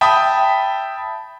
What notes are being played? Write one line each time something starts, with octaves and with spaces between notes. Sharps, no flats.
E5 G5 A5 B5 D#6